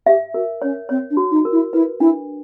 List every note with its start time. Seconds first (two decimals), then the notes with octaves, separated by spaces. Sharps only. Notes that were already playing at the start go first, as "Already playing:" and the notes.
0.06 G4 E5
0.34 F#4 A#4
0.62 C#4 C#5
0.89 C4 C#5
1.10 D4
1.17 F#4
1.31 D#4
1.45 A#4
1.52 E4
1.73 E4 B4
2.00 D4 E4